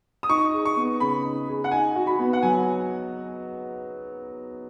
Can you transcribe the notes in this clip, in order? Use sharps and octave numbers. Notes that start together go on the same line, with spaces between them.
D#6
D#4 C#6
G#4
C#6
B3
C#3 B5
D#4
G#4
F#5
D#4 G#5
F#4
B5
B3
F#5
F#3 G#5